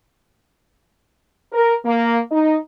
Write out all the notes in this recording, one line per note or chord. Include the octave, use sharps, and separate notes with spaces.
A#4
A#3
D#4